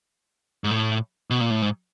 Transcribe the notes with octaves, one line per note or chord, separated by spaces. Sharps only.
G#2
A2
B2
A#2
A2
G#2